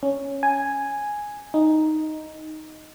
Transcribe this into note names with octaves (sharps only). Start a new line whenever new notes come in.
C#4
G#5
D#4